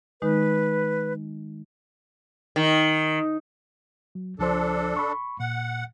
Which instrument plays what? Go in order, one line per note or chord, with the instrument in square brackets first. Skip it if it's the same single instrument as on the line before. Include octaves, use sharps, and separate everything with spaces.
[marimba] D#3 G#3 D#4 [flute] B4
[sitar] D#3
[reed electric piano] F#3
[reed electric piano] C#2 F3 C5 [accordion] D4 A4
[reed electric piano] B5 C#6
[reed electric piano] A#2 [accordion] F#5